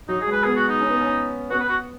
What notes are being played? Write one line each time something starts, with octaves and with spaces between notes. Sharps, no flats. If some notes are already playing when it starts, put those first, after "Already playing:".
F#3 D#4
G#4
G#3
B4
B3 G#4
F#4
D#4
C#4
B3
C#4
B3 F#4
B4
F#4